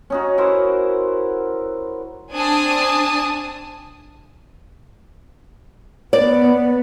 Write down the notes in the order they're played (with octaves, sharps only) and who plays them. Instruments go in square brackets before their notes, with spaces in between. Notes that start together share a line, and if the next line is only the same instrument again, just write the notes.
[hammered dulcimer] C#4 D#4 F#4
E4 F#4 A#4 C5
[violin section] C4 D4 G#5 A5 D#6
[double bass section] B3 [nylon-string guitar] D5